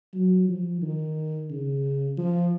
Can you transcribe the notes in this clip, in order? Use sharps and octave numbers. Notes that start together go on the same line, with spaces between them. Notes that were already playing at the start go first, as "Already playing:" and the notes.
F#3
F3
D#3
C#3
F3